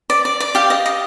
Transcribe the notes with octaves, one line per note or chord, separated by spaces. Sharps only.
D5
D5
D5
G4 F5
D#5
D#5